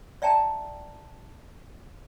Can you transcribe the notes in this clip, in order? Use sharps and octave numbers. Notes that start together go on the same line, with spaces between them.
D5 E5 G5 A5 A#5